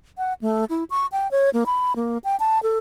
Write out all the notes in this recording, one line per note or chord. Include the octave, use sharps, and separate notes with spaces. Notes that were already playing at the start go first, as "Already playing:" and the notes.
F#5
A3
E4
C#6
G5
C#5
A#3
B5
A#3
G5
A5
A4